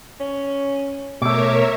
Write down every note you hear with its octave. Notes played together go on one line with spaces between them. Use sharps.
C#4
B2 A3 A#4 C#5 E5 D6